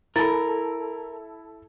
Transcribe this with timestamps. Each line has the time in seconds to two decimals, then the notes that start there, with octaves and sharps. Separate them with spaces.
0.16 E4 A4 A#4 B5 A6